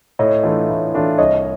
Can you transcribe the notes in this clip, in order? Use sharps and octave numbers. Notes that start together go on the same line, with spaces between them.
A2 C#5 D#5
E3 A3 D4 F4
A2
E3 A3 D4 F4
C2 C#5 D#5